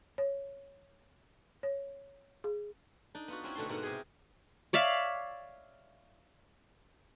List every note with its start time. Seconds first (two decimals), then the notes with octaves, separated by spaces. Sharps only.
0.18 C#5
1.63 C#5
2.44 G#4
3.15 D4 D#4 D5
3.28 B3 F4 F#4
3.44 C4 C#4 E4
3.55 B2 D3 A3 C5 A5 C6
3.69 G#2 B2 A#4 F#5 A#5
3.83 C3 G4 G#4
4.73 C#5 D5 E5 F5